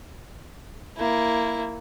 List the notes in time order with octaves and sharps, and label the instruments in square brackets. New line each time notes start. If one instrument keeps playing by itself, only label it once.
[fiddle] A#3 E4